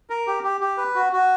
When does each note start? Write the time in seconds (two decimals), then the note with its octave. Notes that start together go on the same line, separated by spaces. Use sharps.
0.10 A#4
0.27 G4
0.44 G4
0.61 G4
0.77 B4
0.95 F#4
1.12 F#4